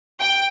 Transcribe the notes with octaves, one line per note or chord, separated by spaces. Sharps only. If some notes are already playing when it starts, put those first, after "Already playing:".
G5